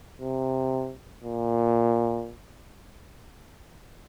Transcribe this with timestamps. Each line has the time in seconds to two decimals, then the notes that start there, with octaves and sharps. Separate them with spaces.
0.21 C3
1.24 A#2